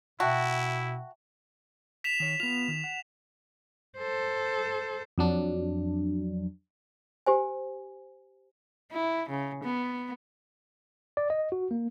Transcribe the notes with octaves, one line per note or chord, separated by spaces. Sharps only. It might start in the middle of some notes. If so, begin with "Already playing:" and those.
B2 E4 F#4 E5 G5 A5
B6 E7 F7
D#3 C#5
B3 F4 F7
D#3
F#5
A4 C5
F2 F#3 D4
G4 C5 G#5
E4
C#3
B3
D5
D#5
F#4
A#3